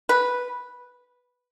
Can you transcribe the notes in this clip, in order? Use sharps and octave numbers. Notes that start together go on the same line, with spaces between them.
B4